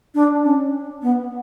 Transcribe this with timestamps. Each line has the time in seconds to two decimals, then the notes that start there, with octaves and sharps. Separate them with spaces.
0.15 D4
0.44 C#4
1.02 B3